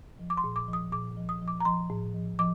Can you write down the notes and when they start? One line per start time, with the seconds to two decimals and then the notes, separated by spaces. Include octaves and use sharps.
0.19 F3
0.30 D6
0.37 C6
0.44 A#2
0.56 D6
0.68 F3
0.73 D#6
0.92 A#2 D6
1.17 F3
1.29 D#6
1.42 F3
1.48 D6
1.60 A#5
1.65 F3 C6
1.90 A2
2.14 F3
2.39 F3 D6